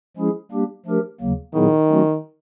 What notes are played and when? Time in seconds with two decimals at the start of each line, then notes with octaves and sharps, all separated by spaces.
0.17 F3 G#3 C#4 E4 G#4
0.52 G3 A#3 D4 G4
0.86 F3 A3 D4 G4 A#4
1.21 D#2 C#3 F#3 A#3
1.54 A#2 D#3 F#3 B3 E4 G#4
1.89 F#3 A3 C#4 F#4